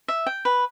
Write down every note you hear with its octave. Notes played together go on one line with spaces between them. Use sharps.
E5
G5
B4